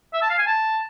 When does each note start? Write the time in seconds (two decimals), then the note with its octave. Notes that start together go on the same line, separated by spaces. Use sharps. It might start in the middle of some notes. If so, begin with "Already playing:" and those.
0.13 E5
0.22 A5
0.30 F5
0.39 G#5
0.47 A5